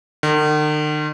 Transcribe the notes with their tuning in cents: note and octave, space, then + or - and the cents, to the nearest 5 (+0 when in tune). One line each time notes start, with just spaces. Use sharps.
D#3 -45